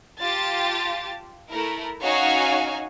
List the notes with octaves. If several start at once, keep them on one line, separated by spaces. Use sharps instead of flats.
F4 G4 A5 A6
A3 E4 A#4
C#4 D#4 F#4 C#5 F5 G#5